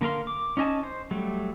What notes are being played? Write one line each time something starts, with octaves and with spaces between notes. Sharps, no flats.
D3 A#3 A#4 F5 C6
D6
C#4 D#4 D#5 G#5 A5
C5
F#3 G3 A3